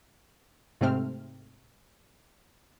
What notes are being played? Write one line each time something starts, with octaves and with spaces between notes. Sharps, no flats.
G#2 C3 A3 C4 F6